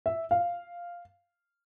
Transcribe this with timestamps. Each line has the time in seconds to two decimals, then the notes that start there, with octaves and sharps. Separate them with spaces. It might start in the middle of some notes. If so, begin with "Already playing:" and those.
0.06 E5
0.31 F5